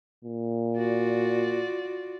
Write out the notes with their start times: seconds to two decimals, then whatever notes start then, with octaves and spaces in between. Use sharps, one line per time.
0.24 A#2
0.76 F4 F#4 D5